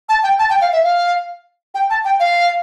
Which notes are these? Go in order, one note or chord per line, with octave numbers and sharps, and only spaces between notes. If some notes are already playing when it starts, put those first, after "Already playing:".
A5
G5
A5
G5
F5
E5
F5
G5
A5
G5
F5